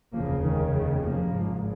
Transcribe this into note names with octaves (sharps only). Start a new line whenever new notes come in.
F1 D#2 C#3 F3 A#3
D#3 G#3
D#3
F3 A#3
G#1 G#2